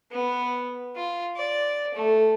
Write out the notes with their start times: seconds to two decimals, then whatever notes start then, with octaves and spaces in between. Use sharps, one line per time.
0.11 B3
0.96 F4
1.36 D5
1.94 A3